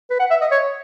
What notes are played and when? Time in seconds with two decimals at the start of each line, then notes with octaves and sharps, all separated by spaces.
0.10 B4
0.19 F#5
0.30 E5
0.41 D#5
0.51 C#5